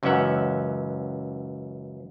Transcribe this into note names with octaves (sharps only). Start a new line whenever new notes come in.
C#2 F#2 E3 C#4 E5 F#5